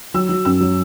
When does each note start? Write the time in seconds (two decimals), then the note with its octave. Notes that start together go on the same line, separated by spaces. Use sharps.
0.14 F#3 E6
0.29 F#3
0.45 F#2 E6
0.61 F#3